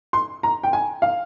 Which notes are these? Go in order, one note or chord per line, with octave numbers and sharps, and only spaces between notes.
C6
A#5
G5
G#5
F5